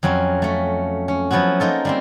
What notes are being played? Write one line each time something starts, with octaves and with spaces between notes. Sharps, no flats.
F2 F#3 C4 C#4
A3 C#4
C#4
F3 F#3 B3 E4 F#4
A#3 D#4 F4 A4
G3 A#3 C4